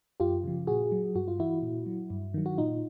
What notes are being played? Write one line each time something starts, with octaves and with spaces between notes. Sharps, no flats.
F#2 F4 G4
C#3 F3
A#2 F#4 G#4
F#3
G2 F#4
F4
E3 E4 F#4
A#2
F#3
G2
D#3 F#3
F#4
A#2 D#4 F4